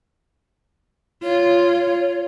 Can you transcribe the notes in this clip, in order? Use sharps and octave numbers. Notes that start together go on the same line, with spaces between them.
F4 C#5